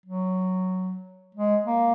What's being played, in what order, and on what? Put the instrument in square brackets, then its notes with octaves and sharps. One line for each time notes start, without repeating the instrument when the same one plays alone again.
[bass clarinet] F#3
G#3
A#3